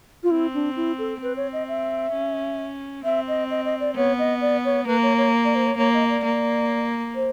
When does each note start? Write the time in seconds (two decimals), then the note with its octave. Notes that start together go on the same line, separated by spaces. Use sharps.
0.23 F4
0.30 C4 E4
0.54 D4
0.76 E4
0.98 A4
1.22 C4 B4
1.37 C#5
1.53 D#5
1.68 E5
2.13 C#4
3.04 C4 E5
3.28 D#5
3.51 D#5
3.65 D#5
3.80 D5
3.95 B3 C#5
4.19 D#5
4.41 D5
4.65 C#5
4.87 A#3 B4
5.03 C#5
5.18 C#5
5.44 D5
5.55 C5
5.66 C#5
5.78 A#3 C#5
5.94 D#5
6.09 D5
6.24 A#3
7.15 C5